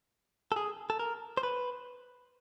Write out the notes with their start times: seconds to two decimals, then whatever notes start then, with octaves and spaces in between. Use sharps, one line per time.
0.52 A4
0.56 G#4
0.90 A4
0.99 A#4
1.37 C5
1.43 B4